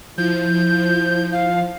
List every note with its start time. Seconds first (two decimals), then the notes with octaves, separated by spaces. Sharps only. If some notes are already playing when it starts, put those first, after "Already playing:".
0.18 F3 E4 G6
1.32 F5